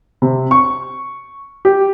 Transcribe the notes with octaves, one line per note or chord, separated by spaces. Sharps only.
C3
C#6
G4